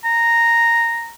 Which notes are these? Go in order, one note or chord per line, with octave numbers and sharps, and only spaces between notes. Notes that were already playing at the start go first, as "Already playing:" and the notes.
A#5